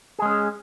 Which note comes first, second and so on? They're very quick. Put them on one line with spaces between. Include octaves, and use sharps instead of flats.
G#4 G#3 C#4